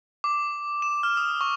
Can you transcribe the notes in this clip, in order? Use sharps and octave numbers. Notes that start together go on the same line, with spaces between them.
D6
E7
F6
D#6
C#6